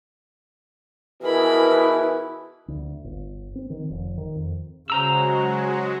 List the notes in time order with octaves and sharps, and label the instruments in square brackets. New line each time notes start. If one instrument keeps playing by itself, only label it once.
[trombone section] B2 E3 G#4 [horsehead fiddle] E4 [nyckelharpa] A#4 B5
[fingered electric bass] D2
G1
C4
D#3
F1
D#3
F2
[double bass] C#3 [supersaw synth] F#3 G#3 F#4 [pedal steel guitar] C5 A#5 E6